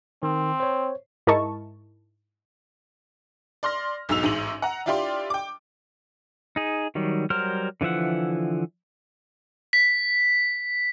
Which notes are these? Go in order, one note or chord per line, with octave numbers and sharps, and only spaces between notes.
D#3 C4
C5 C#5
G#2 E4 A#4 D#5 A5 C#6
D5 C6 F6 A#6
B1 G#2 D#4 E6 F7
A1 G#2 D#7 F#7
F#5 A#5
D4 E4 F4 G4 D5 C6
G5 D6
D#4 G#4
D#3 F#3 G3
F#3 G3 A#4 C5 F6
D3 E3 F3 E5 F#5
B6